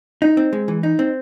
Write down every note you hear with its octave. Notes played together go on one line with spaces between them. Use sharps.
D#4
C4
G#3
E3
D#4
C4